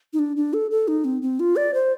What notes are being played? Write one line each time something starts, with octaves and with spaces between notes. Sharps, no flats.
D#4
D4
D4
A4
A4
D#4
C4
C4
F4
D5
C5